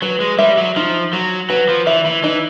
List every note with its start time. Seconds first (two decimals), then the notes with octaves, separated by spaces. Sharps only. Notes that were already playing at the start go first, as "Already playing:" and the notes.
0.02 F#3 B4
0.21 G#3
0.39 G3 E5
0.57 F#3
0.76 F3 D#4
1.13 F#3 F#4
1.50 F#3 B4
1.69 F3
1.87 E3 E5
2.06 E3
2.24 E3 D#4